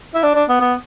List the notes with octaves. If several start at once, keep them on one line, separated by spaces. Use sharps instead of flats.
E4
D4
D4
B3
B3